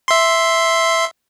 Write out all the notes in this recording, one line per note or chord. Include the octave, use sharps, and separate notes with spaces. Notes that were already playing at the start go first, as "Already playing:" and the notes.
E5 C6